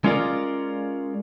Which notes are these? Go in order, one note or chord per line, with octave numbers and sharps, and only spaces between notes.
G#3 C#4 F4 A#4 D5